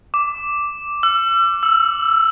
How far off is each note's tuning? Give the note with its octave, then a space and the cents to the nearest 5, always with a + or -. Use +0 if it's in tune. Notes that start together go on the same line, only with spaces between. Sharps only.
D6 -5
E6 +45
E6 +0